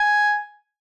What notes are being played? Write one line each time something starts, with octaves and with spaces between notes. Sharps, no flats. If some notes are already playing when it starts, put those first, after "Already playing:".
Already playing: G#5